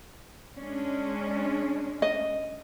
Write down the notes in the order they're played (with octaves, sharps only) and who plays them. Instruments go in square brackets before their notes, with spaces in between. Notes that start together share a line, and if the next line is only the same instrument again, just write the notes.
[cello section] G#3 C#4 D4
[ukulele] D#5